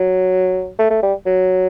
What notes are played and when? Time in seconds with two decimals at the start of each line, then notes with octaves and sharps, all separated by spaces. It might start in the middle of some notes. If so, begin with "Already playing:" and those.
Already playing: F#3
0.79 A3
0.90 A3
1.03 G3
1.26 F#3